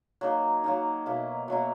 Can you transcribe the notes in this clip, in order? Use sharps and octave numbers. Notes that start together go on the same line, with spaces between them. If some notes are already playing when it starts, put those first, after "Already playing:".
F#3 A#3 D#4
F#3 A#3 D#4
B2 F#3 A#3 E4
B2 F#3 A#3 E4